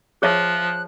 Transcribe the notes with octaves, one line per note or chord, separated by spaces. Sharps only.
F3 G#4 C#5 E5 F#6